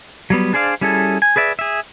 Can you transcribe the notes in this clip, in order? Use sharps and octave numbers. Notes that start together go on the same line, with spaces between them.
F#3 G3 B3
D4 G#4 C5 D5 F5
G3 C#4 E4 G#4 A4
G#5
G#4 B4 D5 E5
G#4 E5